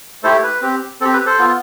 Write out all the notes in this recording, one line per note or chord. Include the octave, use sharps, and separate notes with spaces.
A3 E4 G4 A4 C5
B4
C4 G4
C4 G4 A4
B4
A4 C5
B3 F4